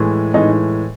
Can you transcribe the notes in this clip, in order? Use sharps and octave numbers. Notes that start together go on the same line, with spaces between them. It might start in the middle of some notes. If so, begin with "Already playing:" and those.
Already playing: A2 E3 G#3
A2 E3 G#3 D#4